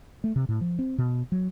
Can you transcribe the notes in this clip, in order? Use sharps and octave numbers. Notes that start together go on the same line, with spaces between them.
A3
C3
A2
F3
C4
B2
F#3